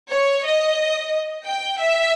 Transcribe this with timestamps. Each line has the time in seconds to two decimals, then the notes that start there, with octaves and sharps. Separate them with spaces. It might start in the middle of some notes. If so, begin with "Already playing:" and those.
0.13 C#5
0.46 D#5
1.47 G5
1.81 E5